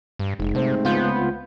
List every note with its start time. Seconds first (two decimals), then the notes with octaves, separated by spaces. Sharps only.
0.19 G2
0.40 F1 G#2
0.55 C3 A3 C4
0.85 C#2 B3 F4 G6